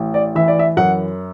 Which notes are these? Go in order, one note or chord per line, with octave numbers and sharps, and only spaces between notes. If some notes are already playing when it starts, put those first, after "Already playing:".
Already playing: A1
D5
E3 E5
D5
E5
F#2 F#5